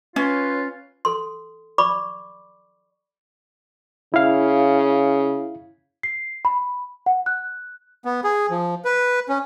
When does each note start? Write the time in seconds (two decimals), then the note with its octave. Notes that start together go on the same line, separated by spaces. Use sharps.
0.16 C#4 F4 B4 C#5
1.05 A4 C6
1.78 D5 B5 C#6 D6
4.14 C#3 E4 F5
6.03 C7
6.45 B5
7.06 F#5
7.26 F#6
8.05 B3
8.24 G#4
8.50 F3
8.85 B4
9.29 C#4